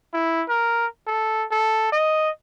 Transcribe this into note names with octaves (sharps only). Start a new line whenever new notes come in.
E4
A#4
A4
A4
D#5